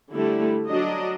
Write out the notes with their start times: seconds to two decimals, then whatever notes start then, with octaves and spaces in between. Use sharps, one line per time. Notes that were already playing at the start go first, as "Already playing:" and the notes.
0.13 D3 G3 A3 E4
0.67 F#3 D4 D#5